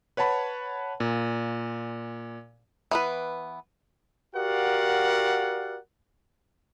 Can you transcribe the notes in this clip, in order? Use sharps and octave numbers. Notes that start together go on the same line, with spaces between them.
B4 C#5 F#5 A5 B5
A#2
E3 B3 B4
F#4 G4 A#4 D5 F5 F#5